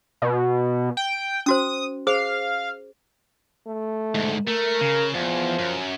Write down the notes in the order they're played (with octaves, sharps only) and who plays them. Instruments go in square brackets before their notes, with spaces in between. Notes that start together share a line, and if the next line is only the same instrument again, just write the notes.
[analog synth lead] B2
G5
[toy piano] C#4 F#4 C5 [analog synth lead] D#6
[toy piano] G#4 C5 [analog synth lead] F5
[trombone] A3
[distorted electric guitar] D2 G#2
[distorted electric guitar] A3 [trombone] A#4
[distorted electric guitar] C#3
[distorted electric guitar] E2 [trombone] F3
[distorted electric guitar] F#2